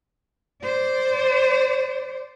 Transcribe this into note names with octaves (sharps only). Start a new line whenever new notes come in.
C5 D5